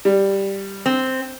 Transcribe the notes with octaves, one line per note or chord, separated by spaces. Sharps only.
G3
C4